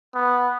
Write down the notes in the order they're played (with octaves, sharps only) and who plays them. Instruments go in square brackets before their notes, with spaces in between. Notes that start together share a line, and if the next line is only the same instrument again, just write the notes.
[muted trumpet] B3